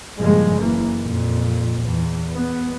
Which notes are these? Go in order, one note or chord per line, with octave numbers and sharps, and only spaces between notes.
G2 A#2 C#3 F3 G#3
F#1 F#2 E3 A#3
F2 A#2
E2
B3